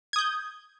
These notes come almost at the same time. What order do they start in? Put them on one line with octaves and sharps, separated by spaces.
G#6 D#6 G6